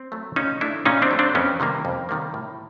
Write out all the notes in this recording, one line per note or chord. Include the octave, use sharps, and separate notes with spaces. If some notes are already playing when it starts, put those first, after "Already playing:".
Already playing: C4
F#3 A3
A#2 C#4 D#4
F#3 A3 D4 E4
A#2 C#4 D#4
C4 D4
F#3 A3
C4 D4
F2 B3 C#4
C3 D#3 G3 A#3
F2
C3 D#3 G3 A#3
A2